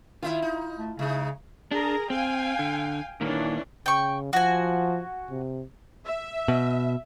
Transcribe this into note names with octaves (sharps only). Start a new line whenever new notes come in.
D#3 E4 F4 E5
D#4
A3
C#3 G#3 D#4
D4 G#4 A#4 A#5
C4 F5 G5 G#5
D3
A#2 D#3 E3 A#3 C#4 D4
C#3 G5 C#6
F3 F#4 G#5
C3
E5
B2